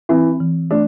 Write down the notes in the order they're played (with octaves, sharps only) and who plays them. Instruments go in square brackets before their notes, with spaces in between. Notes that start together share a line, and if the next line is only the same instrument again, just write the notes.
[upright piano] E3 [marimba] C4
[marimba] E3
[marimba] A3 [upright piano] D4